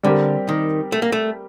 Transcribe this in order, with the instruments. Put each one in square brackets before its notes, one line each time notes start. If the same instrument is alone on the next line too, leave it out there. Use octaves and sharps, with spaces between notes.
[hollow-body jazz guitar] D3 [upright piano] G3 C4 G4 A#4
[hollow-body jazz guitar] D#3
A3
A#3
A3